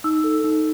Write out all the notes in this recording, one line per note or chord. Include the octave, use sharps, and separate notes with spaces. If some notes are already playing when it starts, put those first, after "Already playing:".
D#4 E6
A4
D#4